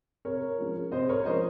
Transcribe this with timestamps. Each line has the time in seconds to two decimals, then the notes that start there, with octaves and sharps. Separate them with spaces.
0.25 C3 A#4 C#5
0.58 F3 G#3 C#4
0.92 C3 C5 D#5
1.09 A#4 C#5
1.26 F3 G#3 C#4 C5 D#5